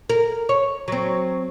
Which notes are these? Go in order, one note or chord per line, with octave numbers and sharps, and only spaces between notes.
A#4
C#5
F#3 C4